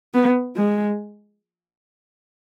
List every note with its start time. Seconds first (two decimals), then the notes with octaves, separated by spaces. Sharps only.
0.14 B3
0.56 G#3